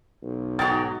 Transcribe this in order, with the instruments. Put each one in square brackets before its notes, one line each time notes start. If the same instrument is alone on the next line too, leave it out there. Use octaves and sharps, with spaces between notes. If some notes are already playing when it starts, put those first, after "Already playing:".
[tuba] B1
[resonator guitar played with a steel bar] G#2 F#3 G5 [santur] F#4 D#5 [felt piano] A6